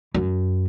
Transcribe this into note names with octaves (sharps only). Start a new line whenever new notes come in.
F#2